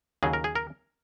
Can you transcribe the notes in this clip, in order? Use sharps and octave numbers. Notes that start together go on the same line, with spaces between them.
D#2 C#3 F#3 G#4
A#4
G#4
A#4